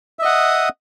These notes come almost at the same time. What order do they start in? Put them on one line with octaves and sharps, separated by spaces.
E5 D#5 F#5 D#6